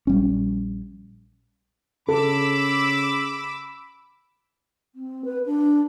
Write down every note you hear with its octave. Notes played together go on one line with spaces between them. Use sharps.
A#1 G3 C#4
C#3 A4 B5 D6 E6
C4
B4
D4